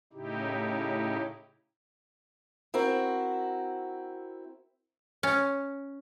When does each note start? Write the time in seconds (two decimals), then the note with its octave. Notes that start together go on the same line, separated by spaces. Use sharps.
0.13 A2 C#3 D#4 E4 G4
2.74 C4 E4 F#4 A#4
5.23 C#4